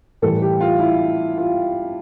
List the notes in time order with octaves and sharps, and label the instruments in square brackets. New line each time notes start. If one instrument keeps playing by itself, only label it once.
[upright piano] A2 E3 G3 A4
G4
F4
E4
F4